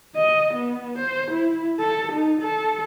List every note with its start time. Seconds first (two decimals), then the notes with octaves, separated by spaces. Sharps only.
0.16 D#5
0.54 B3
0.98 C5
1.31 E4
1.80 A4
2.12 D#4
2.41 A4